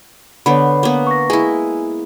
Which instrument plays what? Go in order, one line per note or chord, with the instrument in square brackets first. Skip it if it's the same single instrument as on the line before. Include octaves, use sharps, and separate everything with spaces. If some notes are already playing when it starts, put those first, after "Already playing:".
[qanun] D3 B3 [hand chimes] C#5 B5
[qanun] A#3 B3
[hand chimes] C#6 A#6
[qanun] G#3 E4 [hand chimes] G#5